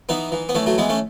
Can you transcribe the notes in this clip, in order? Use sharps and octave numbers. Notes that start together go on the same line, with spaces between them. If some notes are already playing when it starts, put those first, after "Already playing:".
E3 B3 D#4
E3
B3
E3 A3 C#4
F#3 A3
E3 G#3 B3
A3 C#4